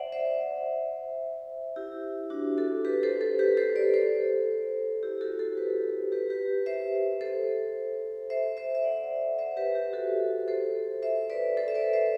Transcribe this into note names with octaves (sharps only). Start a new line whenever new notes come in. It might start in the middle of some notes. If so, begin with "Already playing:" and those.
Already playing: C5 D5 E5 F#5
C5 E5
E4 G4
D4 F#4
F#4 A4
G4 B4
A4 C5
A4 C5
G4 B4
A4 C5
B4 D5
A4 C5
E4 G4
F#4 A4
A4 C5
G4 B4
G4 B4
G4 B4
C5 E5
A4 C5
C5 E5
C5 E5
E5
D5 F#5
C5 E5
G4 B4
G4 B4
F#4 A4
A4 C5
C5 E5
B4 D5
A4 C5
E5
B4 D5
C5 E5